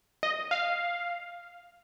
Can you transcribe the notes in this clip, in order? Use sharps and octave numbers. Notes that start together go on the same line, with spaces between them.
D#5
F5